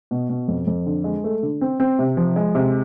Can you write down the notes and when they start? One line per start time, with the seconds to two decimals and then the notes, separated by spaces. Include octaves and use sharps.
0.11 B2
0.29 B2
0.48 F2
0.67 F2
0.86 D3
1.04 G#3
1.24 A3
1.43 D3
1.61 C4
1.80 C4
1.99 C3
2.17 F3
2.36 G#3
2.55 C3